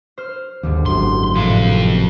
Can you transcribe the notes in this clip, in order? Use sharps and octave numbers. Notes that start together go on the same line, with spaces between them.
C5 F6
D#2 G#2 D3 G3
G#1 F#2 C6
F2 A2 C3 F5